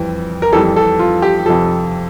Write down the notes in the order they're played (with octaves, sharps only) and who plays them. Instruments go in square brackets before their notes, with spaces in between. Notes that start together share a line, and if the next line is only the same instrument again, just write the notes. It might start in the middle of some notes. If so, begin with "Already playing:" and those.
Already playing: [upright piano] F2 E3 G3
A#4
F2 E3 G3 A4
A4
F4
G4
F2 C3 F3 A4